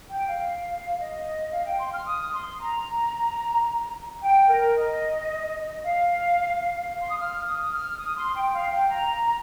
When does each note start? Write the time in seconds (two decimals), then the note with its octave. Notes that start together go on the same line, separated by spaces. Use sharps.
0.09 G5
0.27 F5
0.99 D#5
1.52 F5
1.65 G5
1.79 C6
1.93 F6
2.07 D#6
2.34 C6
2.60 A#5
4.22 G5
4.48 A#4
4.75 D#5
5.83 F5
6.91 F5
7.01 C6
7.10 D#6
7.18 F6
7.45 D#6
7.73 F6
7.99 D#6
8.17 C6
8.36 G5
8.53 F5
8.70 G5
8.89 A#5